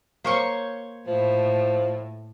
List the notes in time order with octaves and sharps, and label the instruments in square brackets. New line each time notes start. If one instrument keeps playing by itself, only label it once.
[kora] A#3 [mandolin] C5 C#5 C#6
[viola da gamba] A2 [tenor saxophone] F3